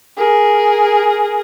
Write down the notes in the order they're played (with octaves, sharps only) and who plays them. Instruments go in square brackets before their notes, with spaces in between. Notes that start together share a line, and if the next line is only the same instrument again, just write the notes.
[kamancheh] G#4 A#4